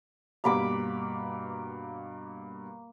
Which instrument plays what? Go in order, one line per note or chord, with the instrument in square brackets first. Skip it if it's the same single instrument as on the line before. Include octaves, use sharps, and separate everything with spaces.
[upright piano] G2 B2 G3 [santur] A#3 B5 D6